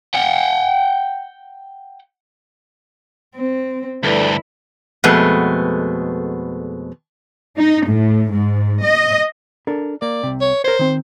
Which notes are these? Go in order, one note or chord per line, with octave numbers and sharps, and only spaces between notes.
F#5 G5
C4
D2 G2 E4 A4 B4 D5
F2 B2 G#3 A3 B3
D#4
A2
G#2
D#5
D4 A4 A#4
A#3 D5
C2 C3
C#5
A#4 C5 C#5
D#3 C4